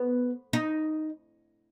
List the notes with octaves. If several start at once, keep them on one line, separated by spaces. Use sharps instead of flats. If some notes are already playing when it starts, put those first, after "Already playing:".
Already playing: B3
D#4